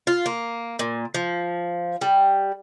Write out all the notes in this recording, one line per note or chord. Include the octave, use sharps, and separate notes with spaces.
F4
A#3
A#2
F3
G3